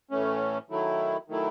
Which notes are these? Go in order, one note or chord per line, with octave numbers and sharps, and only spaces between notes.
A2 E3 A3 C#4
D#3 F#3 A3 E4
D#3 F#3 A3 E4